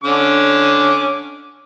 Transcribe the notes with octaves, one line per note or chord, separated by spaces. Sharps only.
D3 C#4 D6